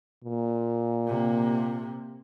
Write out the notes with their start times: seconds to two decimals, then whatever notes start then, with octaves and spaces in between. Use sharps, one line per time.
0.23 A#2
1.07 C3 A#3